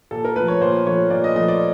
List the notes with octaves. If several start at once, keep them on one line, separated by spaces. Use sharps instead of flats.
A#2 A4
A#4
F3 A3 B4
C#5
A#2 C5
F3 A3 C#5
A#2 D5
D#5
F3 A3 D#5
D5